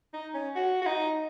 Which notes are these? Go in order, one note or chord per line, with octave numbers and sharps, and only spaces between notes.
D#4
C#4
F#4
F#4
D#4